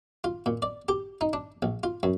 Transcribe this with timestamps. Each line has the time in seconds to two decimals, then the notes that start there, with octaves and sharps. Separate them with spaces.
0.24 F4
0.46 A#2
0.62 D5
0.89 G4
1.21 D#4
1.33 D4
1.62 A#1
1.83 F4
2.03 F#2